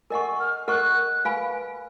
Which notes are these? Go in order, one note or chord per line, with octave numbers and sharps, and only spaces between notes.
A#4 D#5 F#5 G#5 C#6
F6
A#4 D#5 F#5 C#6 F#6
B4 F5 G#5 B5